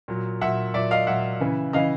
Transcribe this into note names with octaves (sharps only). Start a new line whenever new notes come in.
A#2 F#3
A#2 F#3 E5 F#5
A#2 F#3 D5 E5
D#5 F5
A#2 F#3 E5 F#5
C#3 E3
C#3 E3 D#5 F5